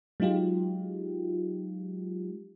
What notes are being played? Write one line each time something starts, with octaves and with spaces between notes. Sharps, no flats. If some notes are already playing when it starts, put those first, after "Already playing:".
F#3 G#3 D#4 F4 G4